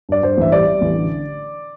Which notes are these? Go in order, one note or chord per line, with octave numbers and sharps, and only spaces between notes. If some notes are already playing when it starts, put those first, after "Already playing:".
G2 D5
G2 C5
A1 E5
G3 D5
G3
A1
D3